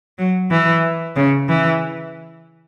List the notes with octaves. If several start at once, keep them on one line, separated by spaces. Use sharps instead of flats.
F#3
E3
C#3
E3